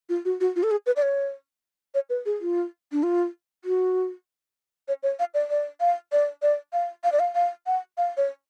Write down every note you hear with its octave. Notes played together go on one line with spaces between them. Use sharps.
F4
F#4
F#4
F4
A4
G#4
B4
D5
C#5
C#5
B4
G#4
F4
D4
F4
F#4
C#5
C#5
F5
D5
D5
F5
D5
D5
F5
F5
D5
F5
F5
F#5
F5
C#5